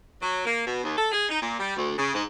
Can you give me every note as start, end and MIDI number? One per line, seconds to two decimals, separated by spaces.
0.21 0.44 54
0.45 0.62 58
0.66 0.82 47
0.83 0.92 39
0.97 1.07 69
1.12 1.28 68
1.29 1.41 63
1.41 1.58 46
1.59 1.76 55
1.76 1.93 38
1.97 2.11 49
2.13 2.22 44